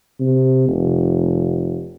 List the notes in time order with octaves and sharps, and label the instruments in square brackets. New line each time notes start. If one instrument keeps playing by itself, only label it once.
[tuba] C3
F1